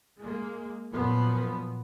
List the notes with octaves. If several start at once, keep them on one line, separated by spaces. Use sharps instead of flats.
G#3 A#3
F#2 A#2 F3 B3